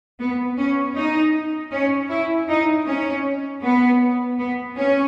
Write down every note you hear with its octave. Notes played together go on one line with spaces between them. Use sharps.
B3
C#4
D#4
C#4
E4
D#4
C#4
B3
B3
C#4